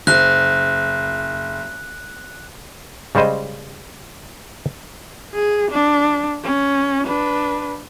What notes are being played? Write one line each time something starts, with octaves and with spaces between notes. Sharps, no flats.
F#1 F#6
C#3 G3 G#3 C5 D#5
G#4
D4
C#4
D4 B4